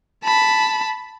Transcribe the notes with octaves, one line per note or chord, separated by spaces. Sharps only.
A5 B5